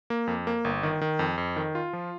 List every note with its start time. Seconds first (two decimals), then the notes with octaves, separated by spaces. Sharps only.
0.10 A#3
0.27 F2
0.47 A#3
0.65 G1
0.83 D#3
1.01 D#3
1.19 F2
1.38 F2
1.56 D#3
1.75 F4
1.93 F3